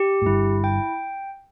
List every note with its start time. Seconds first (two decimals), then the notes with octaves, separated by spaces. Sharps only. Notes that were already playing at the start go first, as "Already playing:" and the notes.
Already playing: G4
0.22 A2
0.26 G1 G2 E4
0.64 G5